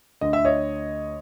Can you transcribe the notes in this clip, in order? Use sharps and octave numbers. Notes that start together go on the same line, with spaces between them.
D2 D3 D#5
E5
C#5 D#5